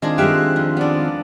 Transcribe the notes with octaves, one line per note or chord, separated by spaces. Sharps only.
D#3 G#3 C4 D4 F4 G#4
G#3 A3 G4 E5 F5 F#6
F2
B3 D4 D5